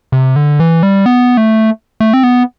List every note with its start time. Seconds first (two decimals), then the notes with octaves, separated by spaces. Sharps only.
0.12 C3
0.36 D3
0.59 E3
0.83 G3
1.06 B3
1.37 A3
2.00 A3
2.14 C4
2.24 B3